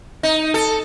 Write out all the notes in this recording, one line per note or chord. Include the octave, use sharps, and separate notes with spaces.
D#4
A4